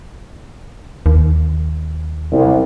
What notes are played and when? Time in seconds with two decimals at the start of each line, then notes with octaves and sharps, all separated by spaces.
1.06 D#2
2.32 C2